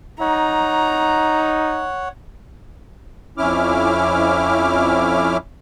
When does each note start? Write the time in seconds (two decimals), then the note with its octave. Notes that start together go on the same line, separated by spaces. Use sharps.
0.20 D#4 C#5 F#5 A#5
3.38 F2 C#4 E4 D6 F6